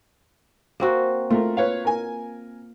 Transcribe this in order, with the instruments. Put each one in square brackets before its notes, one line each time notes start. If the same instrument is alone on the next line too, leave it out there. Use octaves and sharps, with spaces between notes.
[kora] A#3 C4 F#4
[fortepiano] A3 A#4 [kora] F4
[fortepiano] B4 C#5 F5
A#4 G#5